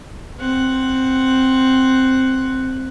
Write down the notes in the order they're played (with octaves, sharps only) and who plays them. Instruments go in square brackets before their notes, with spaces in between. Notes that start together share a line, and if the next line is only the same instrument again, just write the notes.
[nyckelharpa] C4 F#5